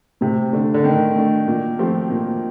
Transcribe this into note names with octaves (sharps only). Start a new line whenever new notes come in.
A2 C3
D3 A3 D4
D3
A2 D#3
A3 D4
A#2
F3 A3 C4 G4
A#2